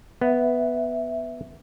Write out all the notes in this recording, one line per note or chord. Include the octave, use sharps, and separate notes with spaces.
B3 E5